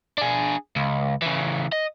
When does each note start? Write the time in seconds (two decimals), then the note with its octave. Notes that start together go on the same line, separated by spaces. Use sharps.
0.18 D4 G#4
0.76 C#2
1.22 C#3 E3
1.72 D#5